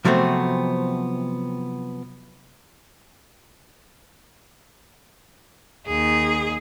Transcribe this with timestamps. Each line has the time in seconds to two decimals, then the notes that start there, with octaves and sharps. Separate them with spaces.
0.05 C3 F3 F#3 A3 B3 C4
5.87 D#2 G#4